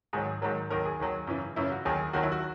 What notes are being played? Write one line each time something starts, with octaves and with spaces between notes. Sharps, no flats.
G#2 D#3 F#3 G#4
G#2 D#3 F#3 A#4
D#2 D#3 F#3 A#4
G#4
D#2 D#3 F#3
F#2 C#3 E3
F#2 C#3 E3 E4
F#4
D#2 D#3 F#3 G#4
D#2 D#3 F#3 F#4
E4
F#4